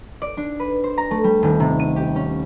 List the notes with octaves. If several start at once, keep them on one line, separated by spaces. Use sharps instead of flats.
D5
D4
B4
C5
A#5
A3
G3
D#1
C3
D#7
G4
C#4